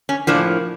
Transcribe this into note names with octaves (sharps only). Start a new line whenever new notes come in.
C#4
A2 F3 A#3 D4